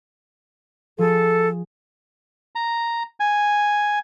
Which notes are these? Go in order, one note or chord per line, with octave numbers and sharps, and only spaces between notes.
F3 G#4 A4
A#5
G#5